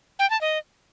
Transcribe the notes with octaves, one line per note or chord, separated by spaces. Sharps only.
G5
A5
D#5